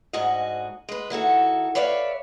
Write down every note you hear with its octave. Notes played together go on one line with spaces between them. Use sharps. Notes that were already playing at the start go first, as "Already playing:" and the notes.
D2 G#2 F#4 G#4 D#5
G#3 B4
D#3 E4 F#4 A4
B4 C#5 D5 E5 F5